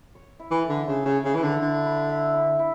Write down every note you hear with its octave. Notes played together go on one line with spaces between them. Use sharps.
C#5
E4
E3
A4
D3
C#3 A3
C#3
C#5
C#3
E3 E4
D3
D3 E4
B4
E5
E4
E4